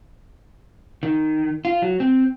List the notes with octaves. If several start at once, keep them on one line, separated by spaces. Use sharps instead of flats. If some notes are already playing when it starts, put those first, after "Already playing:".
D#3
F4
F#3
C4